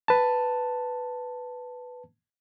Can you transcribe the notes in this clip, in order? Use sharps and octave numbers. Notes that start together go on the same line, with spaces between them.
B4 A5